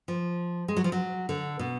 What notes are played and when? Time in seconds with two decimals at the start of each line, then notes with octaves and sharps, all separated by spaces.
0.08 F3
0.68 G#3
0.77 F#3
0.84 F3
0.92 F#3
1.29 D3
1.59 B2